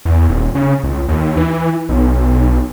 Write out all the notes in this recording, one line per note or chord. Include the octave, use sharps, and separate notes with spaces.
E2
D#1
C#3
C#2
D#2
E3
B1